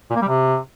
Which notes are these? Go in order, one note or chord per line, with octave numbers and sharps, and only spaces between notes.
A#2
A#3
G3
C3